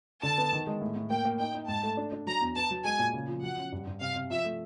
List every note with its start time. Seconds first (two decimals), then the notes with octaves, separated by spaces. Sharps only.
0.23 D3 A5
0.38 B3
0.53 D#3
0.67 G#3
0.81 A2
0.96 A2
1.10 A#3 G5
1.25 A#3
1.40 D#4 G5
1.54 D#4
1.68 G#2 A5
1.83 A3
1.97 D4
2.12 D4
2.27 F#3 A#5
2.41 E2
2.56 B3 A5
2.71 F#3
2.84 G#3 G#5
2.99 A#2
3.13 C#3
3.28 F3
3.42 F#3 F#5
3.57 C#4
3.72 G2
3.87 G2
4.01 C3 F5
4.16 C3
4.30 F3 E5
4.45 A3